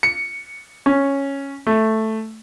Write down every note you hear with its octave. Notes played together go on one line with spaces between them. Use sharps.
C#7
C#4
A3